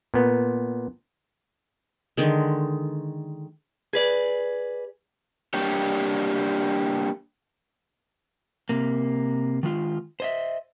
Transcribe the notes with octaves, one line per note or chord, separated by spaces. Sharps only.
A#2 B3
D3 D#3 G#3
G#4 B4 D5
G3 A#3 D4 G4 C#5
C3 A#3
D#3 G#3 F4
C5 D#5 E5